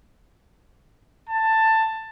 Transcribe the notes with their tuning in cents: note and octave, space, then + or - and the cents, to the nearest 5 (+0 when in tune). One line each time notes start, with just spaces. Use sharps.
A5 +15